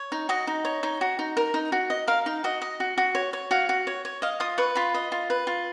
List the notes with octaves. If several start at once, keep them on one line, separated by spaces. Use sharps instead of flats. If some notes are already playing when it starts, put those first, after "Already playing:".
Already playing: C#5
D#4
F#4 D#5
D#4
C#5
D#4
F#4
D#4
A#4
D#4
F#4
D#5
A#4 F5
D#4
F#4 D#5
D#5
F#4
F#4
C#5
C#5
F#4 F5
F#4
C#5
C#5
D#5 F5
F4 D#6
B4 C#6
F4 B5
D#5
F4
B4
F4